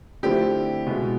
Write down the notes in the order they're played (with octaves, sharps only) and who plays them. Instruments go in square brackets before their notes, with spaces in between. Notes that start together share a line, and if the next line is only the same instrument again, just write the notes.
[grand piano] D3 F3 A3 C4 E4 [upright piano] G4
[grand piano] B2 G#3 B3 E4